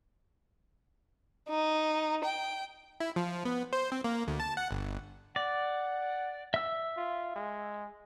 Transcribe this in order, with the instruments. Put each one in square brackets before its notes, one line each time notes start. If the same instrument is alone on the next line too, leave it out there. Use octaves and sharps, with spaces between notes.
[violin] D#4
G5
[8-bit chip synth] E4
F3
B3
C5
C4
A#3
D2
A5
F#5
G1
[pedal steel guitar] D5 [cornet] F#5
[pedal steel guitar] E5 E6
[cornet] F4
G#3